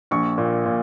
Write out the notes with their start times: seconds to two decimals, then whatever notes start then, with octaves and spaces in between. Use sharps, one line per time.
0.11 A#1 C#6
0.38 A#2
0.66 A#2